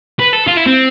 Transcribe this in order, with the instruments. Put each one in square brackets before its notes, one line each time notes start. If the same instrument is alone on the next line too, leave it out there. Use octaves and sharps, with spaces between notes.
[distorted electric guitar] B4
A4
F4
E4
C4